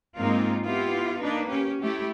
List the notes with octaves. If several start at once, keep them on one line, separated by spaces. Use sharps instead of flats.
G#2 G#3 A#3 C4 D#4 F4
B3 E4 F4 G4
A#3 D4 D#4 B4
C#4 G4
A3 E4 G4